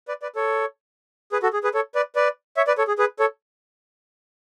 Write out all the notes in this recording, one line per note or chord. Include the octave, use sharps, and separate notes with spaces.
B4 D5
B4 D5
A4 C#5
G#4 B4
F#4 A4
G#4
G#4 B4
A4 C#5
B4 D5
B4 D5
C#5 E5
B4 D5
A4 C#5
G#4
G#4 B4
A4 C#5